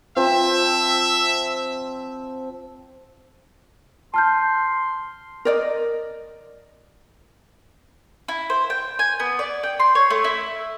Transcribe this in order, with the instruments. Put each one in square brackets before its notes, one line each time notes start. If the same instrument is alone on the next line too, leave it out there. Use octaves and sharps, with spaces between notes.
[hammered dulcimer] F3 C4 [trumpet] E5
[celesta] A5 F6 G6 [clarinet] C6
[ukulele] A#4 D5 D#5
[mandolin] E4
C5
G5
G#5
B3
D5
G5
C6
C#5
A3
E4